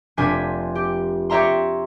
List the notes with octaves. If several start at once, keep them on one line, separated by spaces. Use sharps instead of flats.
F1 D4 C5 G#5 G#6 B6
G4
G4 C#5 E5 A#5 C6